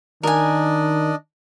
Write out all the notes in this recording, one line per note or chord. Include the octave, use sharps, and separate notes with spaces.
D#3 D4 A#4 D5 D#5 G#5